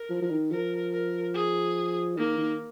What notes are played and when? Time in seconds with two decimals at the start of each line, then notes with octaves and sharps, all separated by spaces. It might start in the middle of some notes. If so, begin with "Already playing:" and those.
Already playing: A#4
0.10 F3
0.22 F3
0.30 D#3
0.51 F3 A#4
0.92 A#4
1.34 G#4
2.17 D#3 A#3
2.38 D#3